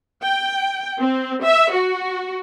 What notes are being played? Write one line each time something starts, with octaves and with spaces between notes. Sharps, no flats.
G5
C4
E5
F#4